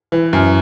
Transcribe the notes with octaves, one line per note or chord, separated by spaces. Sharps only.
E3
F#2